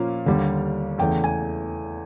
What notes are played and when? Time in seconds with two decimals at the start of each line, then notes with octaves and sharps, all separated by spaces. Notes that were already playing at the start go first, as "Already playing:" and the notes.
Already playing: A#2 F3 A#3 C#4 F5
0.26 D#2 D3 G3
0.98 E2 C#3 E3 A3 G5
1.24 G#5